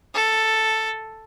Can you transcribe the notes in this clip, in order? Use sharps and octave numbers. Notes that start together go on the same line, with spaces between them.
A4